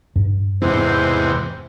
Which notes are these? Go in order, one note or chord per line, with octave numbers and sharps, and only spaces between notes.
G2
E2 G#2 C3 C4 D4 C5